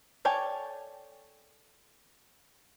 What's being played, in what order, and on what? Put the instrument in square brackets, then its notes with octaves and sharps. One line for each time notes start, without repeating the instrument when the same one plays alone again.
[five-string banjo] A4 C#5 D5 G5 G#5